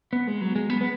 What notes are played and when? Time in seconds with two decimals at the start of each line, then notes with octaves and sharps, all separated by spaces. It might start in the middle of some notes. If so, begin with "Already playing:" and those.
0.13 B3
0.27 G#3
0.41 F#3
0.56 G#3
0.70 B3
0.81 B3